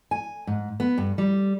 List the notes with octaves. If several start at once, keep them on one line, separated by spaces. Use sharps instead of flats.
G#5
G#2
B3
G2
G3